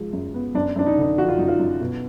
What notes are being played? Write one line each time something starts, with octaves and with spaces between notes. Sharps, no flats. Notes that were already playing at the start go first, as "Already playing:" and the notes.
Already playing: F3 G#3
F#2
B3
F#2 D4
F#2 D4
D#4
D3 D#4
F3 F#4
F4
F#2 D#4
F4
F#2
B2